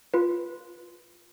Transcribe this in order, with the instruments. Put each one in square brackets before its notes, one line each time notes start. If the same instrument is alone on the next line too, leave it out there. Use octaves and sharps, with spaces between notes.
[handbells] F4 B4